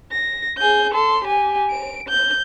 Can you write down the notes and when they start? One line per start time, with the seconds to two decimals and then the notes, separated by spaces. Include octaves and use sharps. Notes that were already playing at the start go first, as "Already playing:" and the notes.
0.12 A#6
0.58 G#4 G6
0.94 A4 C6
1.24 G4 G#5
1.71 D7
2.09 G6